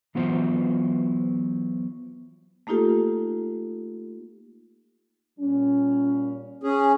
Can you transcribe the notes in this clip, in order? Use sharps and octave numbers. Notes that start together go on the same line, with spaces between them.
E3 F#3 B3 E4 F4 C5
A3 A#3 D#4 F4 G4 A4
A#2 G3 C#4
C#4 G#4